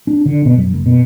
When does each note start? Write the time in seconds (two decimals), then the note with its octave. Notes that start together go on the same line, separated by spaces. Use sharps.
0.07 D4
0.26 D3
0.45 B2
0.57 F#2
0.72 F#1
0.86 B2